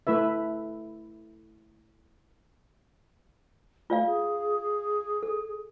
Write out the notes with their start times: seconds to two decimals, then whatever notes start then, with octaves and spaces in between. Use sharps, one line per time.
0.07 A3 E4 B4 E5
3.90 A3 F4 D5 F5
4.07 G#4
5.23 A4